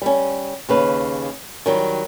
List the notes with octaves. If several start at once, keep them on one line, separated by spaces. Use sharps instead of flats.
G3 C#4
D#2 C#3 B4
D#3 F#3 G3